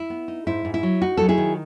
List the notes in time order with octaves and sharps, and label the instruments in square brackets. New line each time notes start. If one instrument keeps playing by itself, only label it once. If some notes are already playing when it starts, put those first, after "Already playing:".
Already playing: [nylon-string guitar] E4
B3
D#4
G#2 E4
G#2
E4
F#3
D#4 F#4
F#3 A4
E4 G#4
D#3